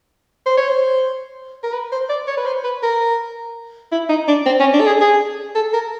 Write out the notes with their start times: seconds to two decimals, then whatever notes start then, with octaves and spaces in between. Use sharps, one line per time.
0.46 C5
0.57 C#5
0.69 C5
1.63 A#4
1.73 B4
1.92 C5
2.09 D5
2.27 C#5
2.37 B4
2.46 C5
2.64 B4
2.83 A#4
3.92 E4
4.09 D#4
4.28 D4
4.46 C4
4.60 C#4
4.74 D4
4.80 A4
4.86 G#4
5.01 G#4
5.55 A4
5.73 A#4